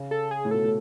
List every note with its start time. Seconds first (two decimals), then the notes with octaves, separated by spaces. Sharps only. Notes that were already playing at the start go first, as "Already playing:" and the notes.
Already playing: C#3
0.11 A4
0.31 G#4
0.45 A2
0.51 B2 A4
0.64 A2